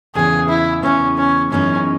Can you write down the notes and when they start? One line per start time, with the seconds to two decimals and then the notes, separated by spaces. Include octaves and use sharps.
0.15 E2 C#3 E3 B3 G#4
0.49 E4
0.83 E2 C#3 E3 B3 C#4
1.18 C#4
1.52 F#2 E3 G#3 B3 C#4 D#4